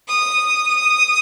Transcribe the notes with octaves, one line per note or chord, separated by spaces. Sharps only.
D#6
D#6